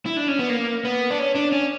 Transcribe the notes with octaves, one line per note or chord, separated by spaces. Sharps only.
E4
D4
C#4
B3
A#3
B3
D4
C#4
D4
C#4